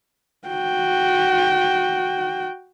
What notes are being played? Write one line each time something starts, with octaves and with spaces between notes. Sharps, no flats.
F#4 G5